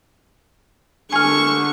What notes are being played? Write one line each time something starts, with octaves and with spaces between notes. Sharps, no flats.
D3 G#5 C#6 F6